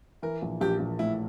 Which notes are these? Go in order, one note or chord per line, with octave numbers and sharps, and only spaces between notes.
E3 A#4
A#1
A#1 G4
A#1
A2 E4